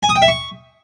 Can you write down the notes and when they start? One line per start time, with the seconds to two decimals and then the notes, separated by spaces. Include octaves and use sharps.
0.03 G#5
0.09 D#6
0.16 G5
0.22 E5
0.28 C#6